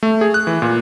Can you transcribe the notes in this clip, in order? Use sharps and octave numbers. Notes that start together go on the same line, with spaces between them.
A3
G#4
F#6
E3
A#2